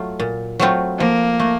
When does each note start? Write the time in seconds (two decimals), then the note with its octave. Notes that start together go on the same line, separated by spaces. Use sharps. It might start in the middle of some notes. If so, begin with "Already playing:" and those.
Already playing: F#3 A3 F4
0.20 A#2
0.59 F#3 A3 C4 F4
0.99 F3 A#3
1.40 A3